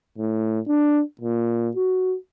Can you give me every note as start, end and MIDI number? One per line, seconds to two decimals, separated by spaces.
0.19 0.59 45
0.68 1.02 62
1.21 1.69 46
1.76 2.16 66